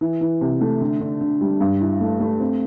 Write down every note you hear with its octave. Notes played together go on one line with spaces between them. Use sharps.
E3
E3
C3
A3
D3
D3
D3
G3
G2
E4
A3
A3
C4